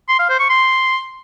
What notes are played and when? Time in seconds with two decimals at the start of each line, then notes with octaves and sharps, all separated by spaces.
0.09 C6
0.19 F5
0.29 C5
0.39 C#6
0.50 C6